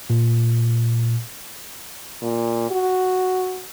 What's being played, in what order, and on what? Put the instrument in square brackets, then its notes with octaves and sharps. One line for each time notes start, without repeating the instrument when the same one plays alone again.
[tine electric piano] A#2
[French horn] A#2
F#4